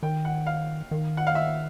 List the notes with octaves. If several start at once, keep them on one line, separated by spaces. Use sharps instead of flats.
D#3 G5
F#5
F5
D#3
F#5
F5
E5